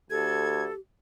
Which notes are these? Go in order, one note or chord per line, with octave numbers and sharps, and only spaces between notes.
D2 G4 A4 G#6